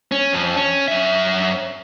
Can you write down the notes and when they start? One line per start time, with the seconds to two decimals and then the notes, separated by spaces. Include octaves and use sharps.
0.12 C#4
0.33 F2
0.56 C#4
0.88 F#2 E5